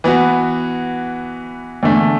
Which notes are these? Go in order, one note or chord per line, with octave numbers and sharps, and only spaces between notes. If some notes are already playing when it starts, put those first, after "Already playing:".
E3 B3 F#4
E2 D3 A3